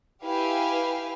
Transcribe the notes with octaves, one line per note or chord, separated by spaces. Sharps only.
E4 G4 B4 F5 G#5